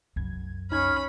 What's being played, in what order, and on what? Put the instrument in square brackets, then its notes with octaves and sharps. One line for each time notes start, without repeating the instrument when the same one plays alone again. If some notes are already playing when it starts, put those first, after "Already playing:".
[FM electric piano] C2 G#6 [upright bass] F#2
[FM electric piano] C2 D#4 G#6 [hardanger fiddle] C#4 B5 [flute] F6